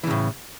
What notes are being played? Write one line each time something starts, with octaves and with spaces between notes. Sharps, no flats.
A2 C#3 E3